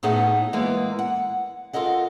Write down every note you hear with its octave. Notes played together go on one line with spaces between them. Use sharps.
A2 B3 D#4 G#4 E5 F#5
E3 G#3 A#3 B3
F#5
F4 A4 A#4 D#5 F#5